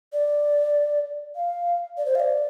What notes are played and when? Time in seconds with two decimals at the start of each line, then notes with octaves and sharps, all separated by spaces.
0.13 D5
1.35 F5
1.97 D5
2.06 C5
2.15 F5
2.20 D5